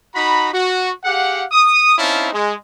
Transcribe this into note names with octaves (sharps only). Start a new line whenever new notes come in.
D#4 F#4 A#5 B5
F#4
G4 G#4 F5 F#5
D#6
C4 C#4 D#4 E4 F5 A5
G#3